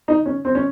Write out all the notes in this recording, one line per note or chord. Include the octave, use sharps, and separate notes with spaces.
D#4
C#4
C4
C#4